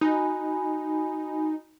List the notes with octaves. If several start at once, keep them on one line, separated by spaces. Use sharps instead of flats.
D#4 F#4 G#5 B5